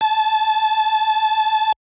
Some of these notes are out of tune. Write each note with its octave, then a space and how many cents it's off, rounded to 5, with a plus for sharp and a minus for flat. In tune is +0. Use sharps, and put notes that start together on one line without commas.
A5 -20